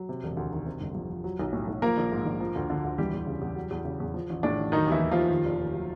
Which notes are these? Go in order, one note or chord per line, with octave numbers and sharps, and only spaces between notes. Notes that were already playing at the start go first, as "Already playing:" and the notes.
Already playing: F#3
C3
E1
D2
D#3
C3
G1
F2
F3
F#3
B1
A2
B1
F3 A#3 A#4
A#1
G#2
A#1
F3
D2
D3
D2
E3 G3 G4
E2
C#3
E2
F#3
E2
C#3
E2
F3
A1
A2 D4
A1
D#3 F#3 D#4
D#2 E3 E4
D#3
D#2 F3 F4
D#3
F1
D#2
F#3